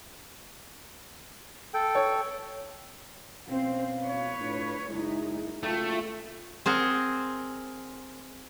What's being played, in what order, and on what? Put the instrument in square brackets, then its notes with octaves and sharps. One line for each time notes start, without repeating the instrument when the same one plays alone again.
[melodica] A4 G5
[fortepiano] C#5
[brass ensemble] B2 C#4 F5 [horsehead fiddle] C4 C5
[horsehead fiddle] B4 C#5
[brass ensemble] A2 D4 F4
[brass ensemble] F#1 E4 [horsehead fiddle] G#3 D#4
[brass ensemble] F#1 A5 [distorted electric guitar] A3 [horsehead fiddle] F4 G5
[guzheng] C4 G#4 A#4 F#5